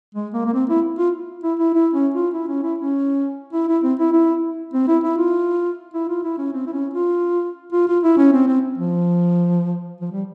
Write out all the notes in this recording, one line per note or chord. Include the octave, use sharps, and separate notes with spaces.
G#3
A#3
A#3
C4
E4
F4
E4
E4
E4
C#4
F4
E4
C#4
E4
C#4
E4
E4
C4
E4
E4
C4
E4
E4
F4
E4
F4
E4
C#4
C4
E4
C#4
F4
F4
F4
E4
C#4
C4
C4
F3
F3
G3